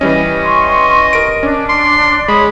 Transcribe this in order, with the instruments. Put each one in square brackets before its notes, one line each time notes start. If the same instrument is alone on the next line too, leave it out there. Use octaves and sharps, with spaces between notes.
[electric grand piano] E3 G3 C#4 [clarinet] D#5
[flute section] C6 C#6
[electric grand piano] A#4 D7
[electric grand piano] C#4 [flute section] D4
[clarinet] C6
[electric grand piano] G#3 [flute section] C#5 D#6 [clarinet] B5